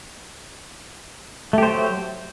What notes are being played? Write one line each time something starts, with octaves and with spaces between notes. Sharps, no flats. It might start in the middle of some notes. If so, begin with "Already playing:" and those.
F#3 A3 G4 C5